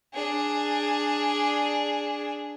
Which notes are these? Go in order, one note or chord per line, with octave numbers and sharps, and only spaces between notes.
D4 G#4